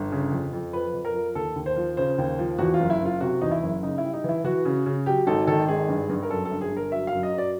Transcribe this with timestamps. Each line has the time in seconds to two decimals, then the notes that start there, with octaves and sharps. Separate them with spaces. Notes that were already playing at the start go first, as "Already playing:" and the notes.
Already playing: G1
0.12 C#3
0.32 F2
0.53 F2
0.73 F3 B4
0.94 F2
1.05 A#4
1.14 F3
1.35 D#2 A4
1.56 D#2
1.66 C5
1.76 F3
1.97 C#3 C5
2.18 D#2
2.38 F3
2.58 E2 F#4
2.74 F4
2.80 F#1
2.90 E4
3.00 F#1
3.05 F4
3.21 C3 F#4
3.41 E2 D#4
3.51 E4
3.62 F#1
3.82 C#3 D#4
3.98 E4
4.03 G3
4.13 D#4
4.24 E3 E4
4.44 E3 F#4
4.65 C#3
4.86 C#3
5.06 F#3 G4
5.27 G#1 A4
5.47 D#3 A4
5.68 G#1 G#4
5.89 G2
6.10 G2
6.23 A#4
6.30 F#2 A4
6.45 A4
6.51 G1
6.61 G#4
6.71 G1
6.77 A#4
6.92 F#3 E5
7.07 F5
7.12 F#2
7.23 D#5
7.33 F#3
7.38 D5